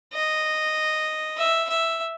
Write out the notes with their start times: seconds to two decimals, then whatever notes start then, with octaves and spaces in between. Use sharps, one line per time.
0.13 D#5
1.38 E5
1.69 E5